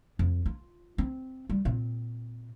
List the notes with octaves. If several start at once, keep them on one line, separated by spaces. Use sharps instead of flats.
F2
F4
C4
G3
A#2 C4